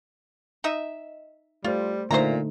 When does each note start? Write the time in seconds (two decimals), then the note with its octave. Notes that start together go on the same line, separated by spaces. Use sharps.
0.64 D#4 D#5 E5
1.64 G3 A3 F4 C5
2.11 A#2 D3 A3 D#4 C5 E5 A#5